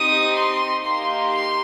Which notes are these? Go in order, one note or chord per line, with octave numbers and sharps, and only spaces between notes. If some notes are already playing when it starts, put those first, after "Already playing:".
Already playing: C4 D#4 G4 D#6
C6
A#3 D#4 G4 C6
C6